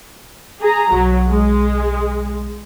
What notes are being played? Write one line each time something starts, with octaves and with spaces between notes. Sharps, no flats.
G#4 A#5
B1 F#3
G#3